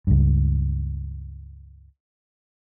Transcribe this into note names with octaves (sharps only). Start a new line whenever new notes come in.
C#2 G2